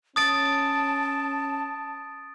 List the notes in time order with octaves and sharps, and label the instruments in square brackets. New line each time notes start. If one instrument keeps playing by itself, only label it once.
[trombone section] C#4 [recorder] A5 [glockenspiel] D#6 A6 D7